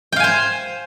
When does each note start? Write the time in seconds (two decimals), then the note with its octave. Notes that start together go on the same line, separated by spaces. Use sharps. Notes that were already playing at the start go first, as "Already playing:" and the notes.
0.12 G5
0.16 F5
0.20 G#5
0.24 C5